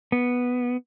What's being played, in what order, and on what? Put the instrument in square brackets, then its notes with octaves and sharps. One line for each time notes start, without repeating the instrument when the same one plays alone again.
[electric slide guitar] B3